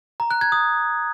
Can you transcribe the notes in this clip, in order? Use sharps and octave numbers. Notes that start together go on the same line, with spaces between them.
A#5
F#6
G#6
D#6